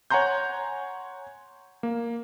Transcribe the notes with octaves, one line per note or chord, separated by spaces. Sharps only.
C#5 F#5 G#5 A#5 C6 G6
A#3